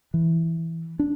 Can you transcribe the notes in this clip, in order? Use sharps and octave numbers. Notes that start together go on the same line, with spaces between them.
E3
D4